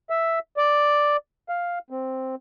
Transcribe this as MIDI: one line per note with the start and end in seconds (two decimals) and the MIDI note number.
0.10 0.39 76
0.57 1.17 74
1.49 1.79 77
1.90 2.35 60